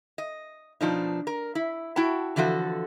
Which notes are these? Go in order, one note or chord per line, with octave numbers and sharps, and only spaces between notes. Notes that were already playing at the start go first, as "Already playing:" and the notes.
D#5
B2 F3 D4 D#4
A#4
E4
E4 F#4 G5 A5
D3 E3 F3 F#4 A4